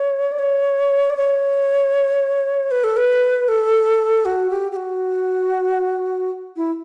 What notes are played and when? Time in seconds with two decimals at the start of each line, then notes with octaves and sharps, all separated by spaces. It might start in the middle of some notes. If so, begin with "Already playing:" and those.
Already playing: C#5
0.32 D5
0.39 C#5
1.10 D5
1.17 C#5
2.71 B4
2.84 A4
2.97 B4
3.48 A4
4.25 F#4
4.50 G4
4.72 G4
4.76 F#4
6.56 E4